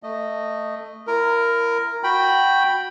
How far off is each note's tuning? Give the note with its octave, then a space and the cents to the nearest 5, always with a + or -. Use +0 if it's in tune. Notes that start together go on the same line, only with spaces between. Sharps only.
A3 +10 D#5 -10
E4 +30 A#4 +0
F#4 -10 G5 +0 B5 +0